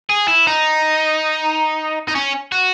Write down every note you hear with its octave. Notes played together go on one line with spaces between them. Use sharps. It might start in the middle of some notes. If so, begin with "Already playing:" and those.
G#4
E4
D#4
D#4
C#4
F#4